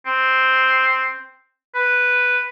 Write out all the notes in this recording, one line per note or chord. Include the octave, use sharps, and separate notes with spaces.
C4
B4